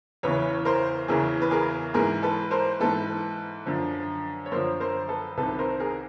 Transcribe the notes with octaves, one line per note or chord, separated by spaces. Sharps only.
E2 C#3 E3 B4 C#5
A#4 C5
E2 C#3 E3 G#4 A#4
B4
G#4 A#4
G#2 E3 G#4 A#4
A4 B4
A#4 C5
G#2 E3 A4 B4
F#2 D3 F3
C#5
F#2 D3 F3 A#4 C5
A#4 C5
A4 B4
C2 C3 D#3 A4 B4
A#4 C5
G#4 A#4